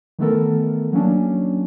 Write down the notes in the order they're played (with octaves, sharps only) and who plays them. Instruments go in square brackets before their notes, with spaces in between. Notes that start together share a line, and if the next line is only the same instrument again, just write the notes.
[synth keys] D#3 E3 A3 B3 A4 A#4
F#3 A#3 C#4 D4